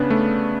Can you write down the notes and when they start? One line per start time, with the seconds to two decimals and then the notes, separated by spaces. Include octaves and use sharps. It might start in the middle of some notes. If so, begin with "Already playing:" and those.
Already playing: C#3 B3 C#4 D4
0.10 A3